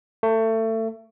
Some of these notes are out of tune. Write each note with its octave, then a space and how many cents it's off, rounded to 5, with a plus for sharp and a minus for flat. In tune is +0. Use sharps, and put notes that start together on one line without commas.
A3 +25